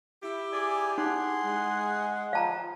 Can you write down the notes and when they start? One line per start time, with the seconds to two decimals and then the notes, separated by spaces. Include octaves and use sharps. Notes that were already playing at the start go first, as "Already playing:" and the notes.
0.23 E4 G4
0.52 G#4 D5 G#5
0.98 D#4 G#4 F#5 C6
1.44 G#3
2.33 F3 F5 A5 A#5